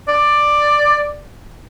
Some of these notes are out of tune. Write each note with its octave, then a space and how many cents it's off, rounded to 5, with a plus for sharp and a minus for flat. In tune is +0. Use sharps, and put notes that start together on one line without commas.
D5 +10